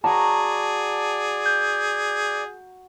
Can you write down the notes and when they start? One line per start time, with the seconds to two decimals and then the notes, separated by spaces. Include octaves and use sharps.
0.04 F#4 G#4 D5 A5 A#5
1.46 G6